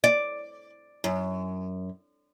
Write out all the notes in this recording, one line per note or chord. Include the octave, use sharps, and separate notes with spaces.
D5
F#2